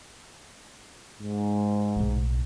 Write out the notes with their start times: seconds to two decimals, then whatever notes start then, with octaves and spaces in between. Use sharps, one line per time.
1.20 G#2
1.96 B1 A2